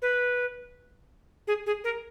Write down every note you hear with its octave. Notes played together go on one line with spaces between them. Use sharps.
B4
G#4
G#4
A#4